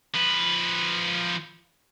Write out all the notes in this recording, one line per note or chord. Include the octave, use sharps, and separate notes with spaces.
F3 B4